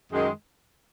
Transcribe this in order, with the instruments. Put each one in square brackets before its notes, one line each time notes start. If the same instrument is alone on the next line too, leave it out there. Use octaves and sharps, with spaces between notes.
[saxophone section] F#2 D#3 G#3